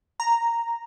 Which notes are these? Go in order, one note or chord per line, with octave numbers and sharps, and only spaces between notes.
A#5